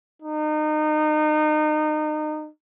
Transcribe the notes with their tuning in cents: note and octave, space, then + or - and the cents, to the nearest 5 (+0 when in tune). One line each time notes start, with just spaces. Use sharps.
D#4 -30